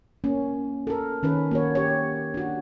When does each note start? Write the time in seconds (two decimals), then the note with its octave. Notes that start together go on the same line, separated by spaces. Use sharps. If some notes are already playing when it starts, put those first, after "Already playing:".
0.24 A#3 C#4
0.87 A4 A#4
1.23 D#3 C#4 B4
1.51 A#3 F#4 C#5
1.75 G4 C#5
2.34 D4 F#4